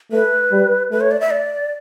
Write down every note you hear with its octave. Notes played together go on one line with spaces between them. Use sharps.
A3 B4
G3
A3 B4
C#5
D5
E5
D5